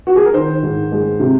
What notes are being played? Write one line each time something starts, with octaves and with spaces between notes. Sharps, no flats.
F#4
G#4
A#4
D#3 C5
G#2
G#3
C3